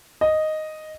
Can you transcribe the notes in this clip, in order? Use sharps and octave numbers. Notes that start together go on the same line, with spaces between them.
D#5